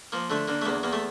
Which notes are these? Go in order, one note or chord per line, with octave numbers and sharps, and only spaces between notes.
F3 A#3
D3 A3
D3 A#3
A3
E2 A#3
E2 A#3
A3